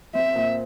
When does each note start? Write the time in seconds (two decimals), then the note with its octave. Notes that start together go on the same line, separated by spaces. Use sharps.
0.15 C4 E5
0.35 A#2